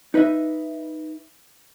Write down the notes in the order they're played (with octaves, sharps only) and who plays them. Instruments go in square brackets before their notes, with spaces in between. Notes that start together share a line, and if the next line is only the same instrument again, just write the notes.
[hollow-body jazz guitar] D#4 B4 D#5 E5